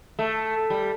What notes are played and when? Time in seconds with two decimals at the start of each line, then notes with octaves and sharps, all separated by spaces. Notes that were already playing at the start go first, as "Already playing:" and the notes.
0.19 A3
0.70 G3